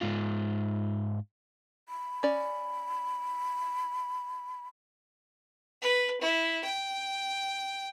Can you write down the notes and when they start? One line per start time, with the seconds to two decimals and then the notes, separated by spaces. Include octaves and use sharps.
0.01 G#2 F4
1.89 B5
2.23 C#4 D5
5.82 B4
6.20 E4
6.64 G5